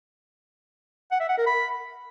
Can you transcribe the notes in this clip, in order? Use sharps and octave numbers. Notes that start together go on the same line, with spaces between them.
F#5
E5
F#5
A#4
B5